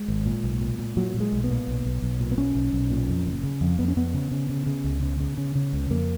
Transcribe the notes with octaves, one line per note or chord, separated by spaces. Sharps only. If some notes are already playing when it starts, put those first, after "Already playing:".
Already playing: G#3
G#1
A#2
B1
A#2
A#2
A#2 F#3
A#2
G#3
B1
B3
A#2
B1
B1
B1
A#2
B3
B1 C#4
B1
B1
A#2
F2
F#1
C#3
F2
F2 B3
C#4
F2 B3
C#3
C#3
C#3
C#3
C#2
C#3
C#3
C#3
C#3
C#2
F2 A#3